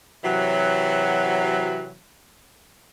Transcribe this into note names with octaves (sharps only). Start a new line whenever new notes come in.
C3 E3 F#3